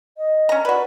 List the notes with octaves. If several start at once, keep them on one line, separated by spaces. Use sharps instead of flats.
D#5
C#4 A#5
F#4 B4 D5